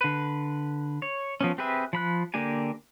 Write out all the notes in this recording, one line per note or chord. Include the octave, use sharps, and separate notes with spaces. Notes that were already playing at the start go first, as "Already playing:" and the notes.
D3 B4
C#5
F3 B3 C#4
C4 G4 G#4 B4 E5
F3 B5 F#6
D3 A#3 D4 G4 G#5